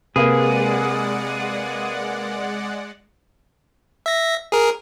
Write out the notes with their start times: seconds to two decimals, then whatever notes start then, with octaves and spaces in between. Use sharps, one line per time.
0.16 C3 G#3 A#3 G#4 B4 D5 F#5
4.06 E5 A#6
4.52 G#4 A#4